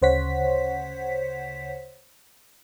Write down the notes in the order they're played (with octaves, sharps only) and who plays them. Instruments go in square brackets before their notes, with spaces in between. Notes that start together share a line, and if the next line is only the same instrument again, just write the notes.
[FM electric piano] D2 C#3 C5 C#5 F#5 B6